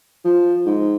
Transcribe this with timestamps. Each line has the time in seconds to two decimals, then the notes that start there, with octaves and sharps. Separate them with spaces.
0.25 F3
0.66 G#2